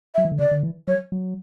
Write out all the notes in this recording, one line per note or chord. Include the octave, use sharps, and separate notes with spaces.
E5
F#3
E3
D3
C#3 D5
D3
E3
F#3 C#5
F#3